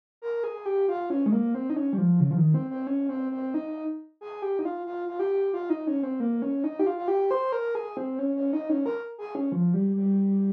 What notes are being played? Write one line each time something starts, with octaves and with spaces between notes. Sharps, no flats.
A#4
G#4
G4
F4
C#4
G#3
A#3
C4
D#4
C#4
G3
F3
C#3
F3
D#3
C4
C4
C#4
C4
C4
D#4
G#4
G4
D#4
F4
F4
F4
G4
F4
D#4
C#4
C4
A#3
C#4
D#4
G4
F4
F4
G4
C5
A#4
G#4
C4
C#4
C#4
D#4
C#4
A#4
G#4
C#4
F3
G3
G3